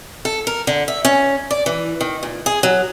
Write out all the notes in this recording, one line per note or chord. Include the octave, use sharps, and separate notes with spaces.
A4
A#4
D3
E5
C#4
D5
E3
D#3
A#2
G#4
F#3